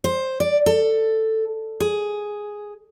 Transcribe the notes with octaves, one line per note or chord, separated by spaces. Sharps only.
C5
D5
A4
G#4